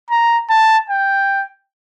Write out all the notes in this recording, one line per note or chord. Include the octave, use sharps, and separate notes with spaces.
A#5
A5
G5